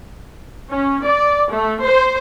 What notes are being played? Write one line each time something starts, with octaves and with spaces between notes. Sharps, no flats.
C#4
D5
A3
C5